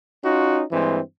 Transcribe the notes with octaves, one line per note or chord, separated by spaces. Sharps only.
C#4 D#4 F4 F#4
G2 E3 G#3 C4